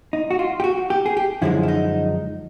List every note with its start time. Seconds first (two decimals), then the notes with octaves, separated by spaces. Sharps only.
0.13 D#4
0.31 F#4
0.39 F4
0.60 G4
0.64 F#4
0.90 G4
1.06 G#4
1.17 G4
1.42 F#2 D3 F3 G#3 E4
1.63 E4
1.68 D#4